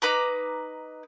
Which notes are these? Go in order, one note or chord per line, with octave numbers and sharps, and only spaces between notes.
D#4 B4 A#5 D6